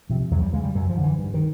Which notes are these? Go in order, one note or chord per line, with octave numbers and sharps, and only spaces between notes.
C3 F3
E2 F#3
G3
C#3 G#3
G3
F#2 F#3
F3
D3
E3
G2
D#3